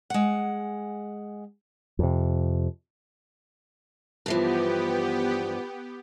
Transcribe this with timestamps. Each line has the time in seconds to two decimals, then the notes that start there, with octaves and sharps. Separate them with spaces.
0.10 G#3 F#5
1.99 F2 C3
4.26 G2 E3 F3 B3 G4